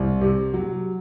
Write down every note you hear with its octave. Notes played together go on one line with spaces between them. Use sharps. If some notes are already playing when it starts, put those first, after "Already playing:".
Already playing: C2
C3
F#3